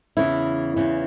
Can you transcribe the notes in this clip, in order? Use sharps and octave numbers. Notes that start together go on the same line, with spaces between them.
E2 C#3 E3 E4
E2 C#3 E3